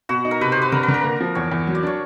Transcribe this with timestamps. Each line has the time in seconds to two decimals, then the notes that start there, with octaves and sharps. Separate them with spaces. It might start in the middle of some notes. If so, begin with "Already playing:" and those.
0.09 B2 F#4
0.25 D#4
0.31 A#4
0.41 C3 B4
0.52 C3 C5
0.62 B4
0.72 D3 A#4
0.83 B4
0.88 D3
0.94 A#4
1.04 A#3
1.21 F3
1.35 E2 C#5
1.52 E2
1.67 F#3
1.75 D5
1.83 D4 C#5